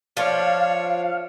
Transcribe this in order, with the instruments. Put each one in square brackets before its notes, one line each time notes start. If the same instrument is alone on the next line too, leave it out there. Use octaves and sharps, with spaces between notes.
[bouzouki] F3 D4 [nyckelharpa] C#5 [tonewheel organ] F5